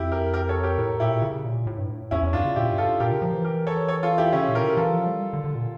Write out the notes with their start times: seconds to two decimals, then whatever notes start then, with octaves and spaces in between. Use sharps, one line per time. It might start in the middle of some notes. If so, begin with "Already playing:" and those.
Already playing: F2 E4 G4
0.12 G4 A#4
0.34 G4 A#4
0.49 A4 C#5
0.64 G4 A#4
0.78 A2
1.00 A#2 E4 G4
1.22 C#3
1.45 A#2
1.67 A2
1.78 G2
1.90 A2
2.11 E2 C#4 E4
2.23 E2
2.33 G2 D4 F4
2.45 C#3
2.56 A#2 E4 G4
2.71 G2
2.78 F4 A4
3.00 A#2 G4 A#4
3.12 C#3
3.22 F3
3.34 E3
3.44 G4 A#4
3.67 A4 C#5
3.88 A4 C#5
4.03 F4 A4
4.18 E4 G4
4.32 C#3 C#4 E4
4.48 A#2
4.55 G4 A#4
4.62 C#3
4.77 E3 F4 A4
4.93 F3
5.07 G3
5.33 D3
5.44 D3
5.55 A#2